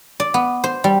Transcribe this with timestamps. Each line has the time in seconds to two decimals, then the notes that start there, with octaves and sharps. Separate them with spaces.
0.20 D5
0.34 B3
0.64 C5
0.84 G3